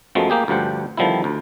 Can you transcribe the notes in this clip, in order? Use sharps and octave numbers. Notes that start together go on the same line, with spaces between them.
F#2 F3 F#3 G#3 A3 B3
A#3 G4 G#4
D2 G2 F3 G4 F#5
D3 D#3 F3 G3 B3 E4
D2